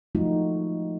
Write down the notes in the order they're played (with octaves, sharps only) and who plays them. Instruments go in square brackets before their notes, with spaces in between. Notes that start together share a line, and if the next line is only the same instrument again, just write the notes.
[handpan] F3 G#3 A3 D#4 F4 F#4